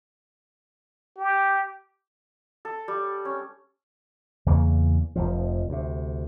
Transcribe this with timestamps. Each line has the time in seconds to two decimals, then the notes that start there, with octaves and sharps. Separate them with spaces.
1.17 G4
2.65 A4
2.88 G3
3.25 C#4
4.46 E2 C#3 A#3
5.16 F1 F2 F3
5.69 D2 C3